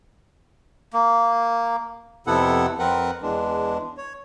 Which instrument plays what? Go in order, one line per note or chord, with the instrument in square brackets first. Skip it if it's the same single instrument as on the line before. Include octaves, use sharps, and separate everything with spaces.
[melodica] A#3
[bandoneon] F2 C3 B3 E4 A4 F#5
F2 C4 A#4 B4 F#5 F#6
E2 E3 G#3 D4
C#5